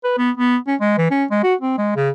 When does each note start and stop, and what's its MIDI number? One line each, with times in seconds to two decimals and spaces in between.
0.04 0.16 71
0.18 0.31 59
0.37 0.57 59
0.67 0.75 61
0.80 0.94 56
0.98 1.10 52
1.11 1.25 61
1.31 1.39 56
1.43 1.54 66
1.61 1.77 60
1.78 1.94 56
1.96 2.10 49